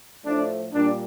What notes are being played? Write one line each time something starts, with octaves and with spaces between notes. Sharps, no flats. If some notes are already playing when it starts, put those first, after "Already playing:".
A2 F3 A3 D4
A#2 G3 A#3 D4